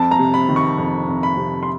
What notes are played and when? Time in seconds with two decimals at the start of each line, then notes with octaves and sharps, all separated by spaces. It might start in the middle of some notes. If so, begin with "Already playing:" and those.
Already playing: F2 A5
0.11 A#5
0.19 C3
0.34 B5
0.49 D#3
0.56 C#6
0.78 F2
1.08 F2
1.23 B5
1.37 C3
1.63 C6